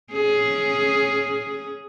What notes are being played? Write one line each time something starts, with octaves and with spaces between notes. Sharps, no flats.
C#4 G#4